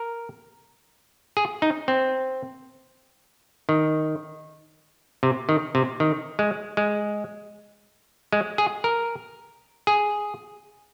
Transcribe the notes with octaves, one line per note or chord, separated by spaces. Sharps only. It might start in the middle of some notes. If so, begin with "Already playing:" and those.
Already playing: A#4
G#4
D#4
C4
D#3
C3
D#3
C3
D#3
G#3
G#3
G#3
G#4
A#4
G#4